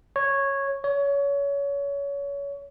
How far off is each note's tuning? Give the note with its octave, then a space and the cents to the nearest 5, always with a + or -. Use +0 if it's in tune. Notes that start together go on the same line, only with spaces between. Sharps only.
C#5 -10
C#5 +25